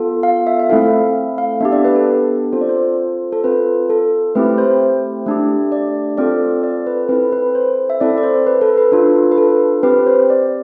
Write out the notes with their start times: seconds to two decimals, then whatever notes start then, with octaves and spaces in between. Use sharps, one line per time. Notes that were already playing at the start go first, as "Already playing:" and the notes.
Already playing: B3 F4 A4
0.23 F5
0.47 E5
0.60 E5
0.70 A3 C4 E4 A4 F5
1.38 F5
1.60 B3 D4 G4 E5
1.72 D5
1.84 B4
1.96 A4
2.52 C4 F4 A4 C5
2.61 D5
2.69 C5
3.32 A4
3.44 C4 F4 A4 B4
3.90 A4
4.35 A3 C4 E4 G4 B4
4.58 C5
5.26 A3 D4 G4
5.72 D5
6.17 C4 F4 A4 D5
6.64 D5
6.87 B4
7.09 C4 E4 A4 B4
7.32 B4
7.55 C5
7.90 E5
8.00 C4 E4 A4 D5
8.18 D5
8.23 C5
8.47 B4
8.61 A4
8.77 B4
8.92 D4 F4 A4
9.32 B4
9.38 A4
9.83 C4 G4 B4
10.07 C5
10.30 D5